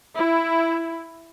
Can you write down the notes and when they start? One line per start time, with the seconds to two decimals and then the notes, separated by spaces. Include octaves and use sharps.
0.16 E4